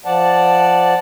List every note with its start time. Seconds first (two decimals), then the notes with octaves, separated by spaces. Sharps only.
0.05 F3 D5 F#5 A5